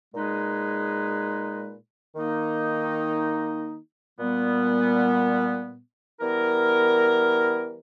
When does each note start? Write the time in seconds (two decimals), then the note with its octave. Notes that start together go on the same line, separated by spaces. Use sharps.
0.14 A#2 G#3 D#4 G#4 B4
2.16 D#3 A#3 D#4
4.19 A#2 G3 B3
6.21 E3 G3 B3 E4 A#4